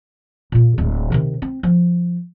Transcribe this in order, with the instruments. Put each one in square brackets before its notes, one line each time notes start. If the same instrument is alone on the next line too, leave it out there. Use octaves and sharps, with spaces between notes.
[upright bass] A#2 F4
D1 G#3
C3 D#3
C4
F3